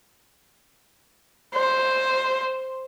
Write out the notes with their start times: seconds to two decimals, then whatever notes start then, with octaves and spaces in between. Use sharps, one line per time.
1.55 C5